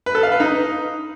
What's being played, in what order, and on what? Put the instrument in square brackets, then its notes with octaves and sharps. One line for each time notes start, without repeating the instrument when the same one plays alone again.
[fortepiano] B4
A4
F5
B4
D#4